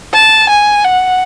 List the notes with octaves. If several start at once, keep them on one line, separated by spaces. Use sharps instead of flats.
A5
G#5
F#5